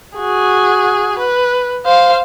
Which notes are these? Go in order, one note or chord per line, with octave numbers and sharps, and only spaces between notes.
F#4 G#4
B4
C5 F5